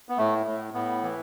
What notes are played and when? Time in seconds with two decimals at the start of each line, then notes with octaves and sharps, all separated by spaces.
0.09 B3
0.17 A2 A3
0.46 A2
0.74 A2 B3
1.03 E3